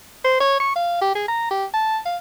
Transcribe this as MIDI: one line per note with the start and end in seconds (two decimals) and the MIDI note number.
0.24 0.37 72
0.40 0.59 73
0.60 0.76 85
0.76 0.98 77
1.02 1.14 67
1.15 1.23 68
1.28 1.50 82
1.51 1.65 67
1.74 1.98 81
2.06 2.17 77